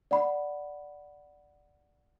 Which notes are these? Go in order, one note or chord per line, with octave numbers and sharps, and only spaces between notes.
D5 F#5 B5